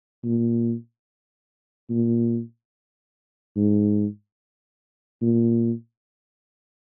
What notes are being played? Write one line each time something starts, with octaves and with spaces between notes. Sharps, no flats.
A#2
A#2
G#2
A#2